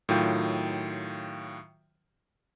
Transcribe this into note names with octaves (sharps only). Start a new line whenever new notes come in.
A2 D#3 F#3 F4 G5 G6